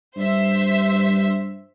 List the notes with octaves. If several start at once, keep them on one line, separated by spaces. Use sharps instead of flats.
G2 C5 E5